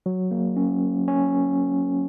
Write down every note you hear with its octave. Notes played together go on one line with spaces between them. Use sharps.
F#3
A#3
C#4
C#4